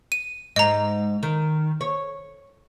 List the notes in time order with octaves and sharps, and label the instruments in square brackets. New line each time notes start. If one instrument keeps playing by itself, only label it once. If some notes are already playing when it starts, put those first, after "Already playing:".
[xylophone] D#7
[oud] G#2 [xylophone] D#5 A#5
[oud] D#3
C#5